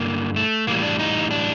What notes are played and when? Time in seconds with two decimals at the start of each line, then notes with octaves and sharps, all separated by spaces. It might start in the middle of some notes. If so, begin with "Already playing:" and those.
Already playing: G2 D3 A#3
0.36 A3
0.67 A2 E3 G3 A#3
0.83 D4
0.99 D#4
1.31 D4